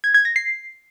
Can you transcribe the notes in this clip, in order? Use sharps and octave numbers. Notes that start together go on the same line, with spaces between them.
G#6
G#6
A#6
C7